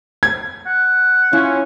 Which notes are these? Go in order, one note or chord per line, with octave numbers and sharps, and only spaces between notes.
G#6
F#5
C#4 E4 F4